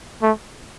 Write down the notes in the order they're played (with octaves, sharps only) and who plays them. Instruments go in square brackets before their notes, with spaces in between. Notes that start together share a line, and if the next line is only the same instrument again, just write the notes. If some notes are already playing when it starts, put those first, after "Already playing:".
[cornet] A3